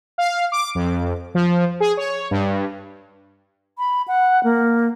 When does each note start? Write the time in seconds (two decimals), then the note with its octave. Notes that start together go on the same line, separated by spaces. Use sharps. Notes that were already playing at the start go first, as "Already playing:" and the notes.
0.18 F5
0.52 D6
0.75 F2
1.35 F3
1.80 G#4
1.97 C#5
2.31 G2
3.78 B5
4.08 F#5
4.44 A#3